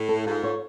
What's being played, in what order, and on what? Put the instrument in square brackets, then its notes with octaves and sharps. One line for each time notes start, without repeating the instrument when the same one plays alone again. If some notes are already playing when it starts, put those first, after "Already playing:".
Already playing: [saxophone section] A2
[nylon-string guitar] A4
[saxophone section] G#2 [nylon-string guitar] F4
[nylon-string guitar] C#5